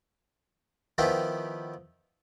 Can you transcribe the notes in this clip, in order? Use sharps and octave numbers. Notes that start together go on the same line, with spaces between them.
D#3 F3 B3 E4 F4 G4